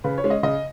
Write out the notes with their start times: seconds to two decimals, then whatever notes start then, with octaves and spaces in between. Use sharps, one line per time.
0.04 C#3 B4
0.18 C#5
0.24 G#3 C#4
0.30 D#5
0.43 C#3 D#5